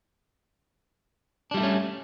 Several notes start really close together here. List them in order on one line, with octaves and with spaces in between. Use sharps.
D4 G3 E4 A3 C#4